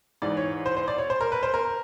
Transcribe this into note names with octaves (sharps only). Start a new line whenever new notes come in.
G#2 E3 D5
C#5
C5
C5
D5
C#5
C5
A#4
B4
C5
A#4